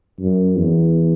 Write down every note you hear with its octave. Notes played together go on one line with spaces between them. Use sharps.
F#2
E2